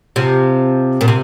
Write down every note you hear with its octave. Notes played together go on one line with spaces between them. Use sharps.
C3 F3
A#2
C3